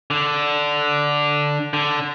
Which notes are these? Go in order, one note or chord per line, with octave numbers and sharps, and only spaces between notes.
D3
D3